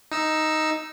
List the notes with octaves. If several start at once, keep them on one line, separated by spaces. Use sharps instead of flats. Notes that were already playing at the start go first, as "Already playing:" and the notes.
D#4 E6